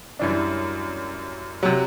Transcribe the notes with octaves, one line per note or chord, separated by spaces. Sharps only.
F#2 E3 G3 D4
C3 F#3